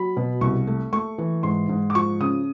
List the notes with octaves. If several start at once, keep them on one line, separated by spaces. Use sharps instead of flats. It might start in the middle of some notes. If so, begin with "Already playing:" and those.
Already playing: F#3 B5
B2
C2 C#6
A3
A3 C#6
E3
G#2 C6
G#2
D6
F3 C#6
C#3 D#6